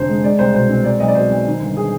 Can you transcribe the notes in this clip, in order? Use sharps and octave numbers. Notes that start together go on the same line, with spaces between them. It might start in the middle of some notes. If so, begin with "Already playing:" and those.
Already playing: F1 D3 C5
G#3
G#3 D5
C2 C5
B2 C5
C4
G#3 D5
B1 D#5
D5
B2 C5
B1
D#3
G1
G#4